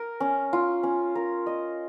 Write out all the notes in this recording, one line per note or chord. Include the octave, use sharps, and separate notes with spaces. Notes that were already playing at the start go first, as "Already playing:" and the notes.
Already playing: A#4
C#4
F4
C#4
A#4
D#5